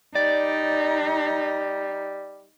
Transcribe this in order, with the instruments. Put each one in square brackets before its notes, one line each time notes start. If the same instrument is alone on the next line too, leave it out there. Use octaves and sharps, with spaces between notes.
[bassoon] G3 [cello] D#4 [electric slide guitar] D5